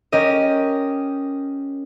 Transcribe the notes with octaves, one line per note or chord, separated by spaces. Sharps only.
C#4 G4 A#4 D#5